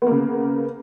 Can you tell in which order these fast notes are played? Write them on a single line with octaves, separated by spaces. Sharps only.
B3 A#3 C#3